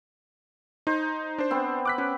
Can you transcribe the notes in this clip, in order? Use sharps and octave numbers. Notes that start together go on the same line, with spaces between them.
D#4 C5
D4 C5
B3 C4
D6 F#6 B6
C#4 D6